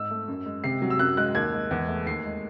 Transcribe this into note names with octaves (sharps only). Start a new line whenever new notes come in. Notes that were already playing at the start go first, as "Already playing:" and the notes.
Already playing: G#2 E6
A3
F#2
G#3
C3 C7
F#3
E6
F#2 F#6
G#3 F#6
D#2 G#6
G#3
E2
A3
D#2 C7
G#3